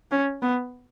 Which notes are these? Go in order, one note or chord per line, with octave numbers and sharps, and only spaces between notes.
C#4
B3